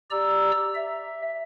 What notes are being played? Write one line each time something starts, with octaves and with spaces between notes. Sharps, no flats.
G4 D5 A#5 E6
E5